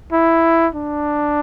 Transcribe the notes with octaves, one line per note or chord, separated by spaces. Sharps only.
E4
D4